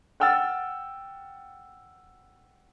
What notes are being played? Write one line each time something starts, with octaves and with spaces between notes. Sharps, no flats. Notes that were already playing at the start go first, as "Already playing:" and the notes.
F#5 G5 E6 F6 A6